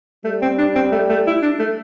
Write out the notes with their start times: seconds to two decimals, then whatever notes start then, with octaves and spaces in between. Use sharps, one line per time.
0.24 G3 A3
0.42 C4
0.58 D4
0.75 C4
0.92 A3
1.09 A3
1.27 E4
1.42 D4
1.59 A3